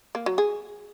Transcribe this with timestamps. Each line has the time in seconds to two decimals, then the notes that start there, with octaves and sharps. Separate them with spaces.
0.15 A#3
0.26 F#3
0.38 G#4